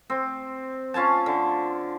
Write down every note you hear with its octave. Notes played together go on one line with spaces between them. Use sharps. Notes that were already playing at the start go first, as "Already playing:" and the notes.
C4
C#4 F4 G#5 A5
D3